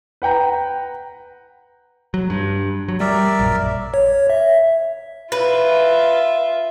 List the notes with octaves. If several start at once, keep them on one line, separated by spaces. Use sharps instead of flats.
B4 F#5 G5 A#5
F#3
G2
F#3
G3 A#4 D5 E5
A#1 F#2
C#5
E5
F4 B4 E5